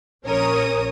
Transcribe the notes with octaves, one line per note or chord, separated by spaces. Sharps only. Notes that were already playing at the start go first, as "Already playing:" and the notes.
A#1 C#4 A#4 C#5 D#6